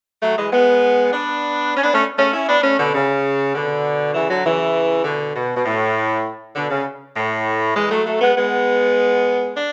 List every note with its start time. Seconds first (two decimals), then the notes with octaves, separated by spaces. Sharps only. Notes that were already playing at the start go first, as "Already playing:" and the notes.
0.23 F#3 A3
0.37 E3 G#3
0.53 G#3 B3
1.13 B3 D4
1.77 C#4
1.84 B3 D4
1.93 A3 C#4
2.19 A3 C#4
2.34 C#4 E4
2.48 B3 D4
2.60 B3
2.64 A3 C#4
2.79 B2 D3
2.95 C#3
3.54 B2 D3
4.14 C#3 E3
4.30 D3 F#3
4.44 C#3 E3
5.05 B2 D3
5.36 B2
5.57 B2
5.65 A2
6.56 B2 D3
6.71 C#3
7.17 A2
7.76 E3 G#3
7.91 F#3 A3
8.06 F#3 A3
8.21 G#3 B3
8.37 G#3 B3
9.57 D4